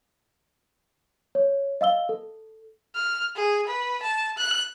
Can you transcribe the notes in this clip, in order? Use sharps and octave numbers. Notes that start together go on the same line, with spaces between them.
C#5
D#5 F5 E6 G7
A4
F6
G#4
B4
A5
F#6